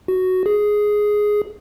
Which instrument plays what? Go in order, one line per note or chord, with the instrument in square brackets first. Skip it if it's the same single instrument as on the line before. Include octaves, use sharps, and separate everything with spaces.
[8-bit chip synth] F#4
G#4